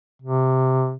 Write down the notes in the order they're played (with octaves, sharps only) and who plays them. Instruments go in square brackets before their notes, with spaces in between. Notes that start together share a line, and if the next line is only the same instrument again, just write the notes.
[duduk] C3